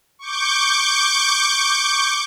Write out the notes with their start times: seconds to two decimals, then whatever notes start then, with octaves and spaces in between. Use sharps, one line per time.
0.19 C#6 D6 G6